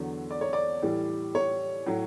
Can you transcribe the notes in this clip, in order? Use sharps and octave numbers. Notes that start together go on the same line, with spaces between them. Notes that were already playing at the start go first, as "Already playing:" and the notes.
Already playing: E2 D3 F#3
D5
C#5
D5
A2 E3 G3
C#5
A2 F#3